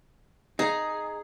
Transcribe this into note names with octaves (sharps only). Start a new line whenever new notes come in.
D#4 G#4